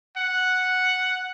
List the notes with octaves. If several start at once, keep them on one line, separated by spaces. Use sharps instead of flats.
F#5